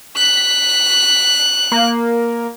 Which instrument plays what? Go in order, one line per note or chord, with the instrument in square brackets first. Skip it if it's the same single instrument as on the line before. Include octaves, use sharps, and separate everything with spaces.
[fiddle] F#6 [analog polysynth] B6
[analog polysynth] A#3